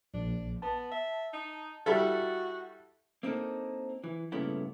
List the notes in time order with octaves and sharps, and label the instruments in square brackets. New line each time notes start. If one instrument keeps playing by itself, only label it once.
[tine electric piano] A#1 [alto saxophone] D4
[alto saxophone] B3 [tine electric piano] A5
[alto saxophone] E5
D#4
[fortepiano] G3 E4 A4 [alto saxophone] F#4
[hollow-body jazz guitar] A#3 C4 D4 D#4 A4
E3
G2 A#2 C#3 A3 B3 E4